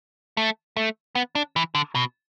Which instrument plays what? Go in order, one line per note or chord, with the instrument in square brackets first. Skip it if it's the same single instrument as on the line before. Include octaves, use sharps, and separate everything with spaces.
[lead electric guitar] A3
A3
B3
D4
E3
D3
B2